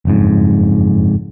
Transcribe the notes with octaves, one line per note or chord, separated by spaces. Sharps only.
F#1 F2 G#2